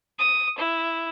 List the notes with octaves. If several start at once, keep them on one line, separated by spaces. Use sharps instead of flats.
D#6
E4